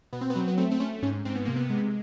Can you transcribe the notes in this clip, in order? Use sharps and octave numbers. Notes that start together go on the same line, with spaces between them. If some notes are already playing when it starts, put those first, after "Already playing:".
B2 B3
C4
B3
F#3 C4
B3
A3 C4
C4
A3 C#4
G#2 C#4
G#2 C4
B3
C3 A#3
B3
G#3